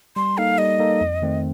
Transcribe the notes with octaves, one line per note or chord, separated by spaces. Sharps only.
G3 C6
A#3 D#4 A4 F5
G3 D#5
A#3 D#4 A4
F2
D#3 A3 C4